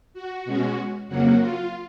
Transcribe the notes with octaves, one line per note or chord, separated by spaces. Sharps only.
F#4
B2 G#3 C#4 F#4
F2 C#3 F#3 A#3 F#4
F4